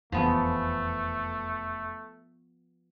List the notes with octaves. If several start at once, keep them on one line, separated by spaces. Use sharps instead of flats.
F1 E2 F3 A3 B3 G#4